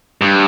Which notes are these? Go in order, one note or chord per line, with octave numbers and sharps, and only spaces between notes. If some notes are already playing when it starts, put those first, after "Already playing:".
G2